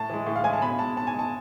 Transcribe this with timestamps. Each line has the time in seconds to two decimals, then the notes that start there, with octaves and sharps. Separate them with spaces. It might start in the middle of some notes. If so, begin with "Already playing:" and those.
Already playing: A2 A5
0.10 E3 G#3
0.26 A2
0.36 F5
0.44 E3 G#3 G#5
0.53 A5
0.62 B2 B5
0.79 G#3 A5
0.97 B2 A5
1.07 G#5
1.14 G#3 A5